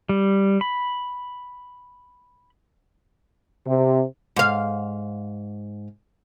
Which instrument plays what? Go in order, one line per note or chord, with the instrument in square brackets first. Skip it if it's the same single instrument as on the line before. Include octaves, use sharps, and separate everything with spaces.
[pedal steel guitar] G3
B5
[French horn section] C3
[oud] G#2 F5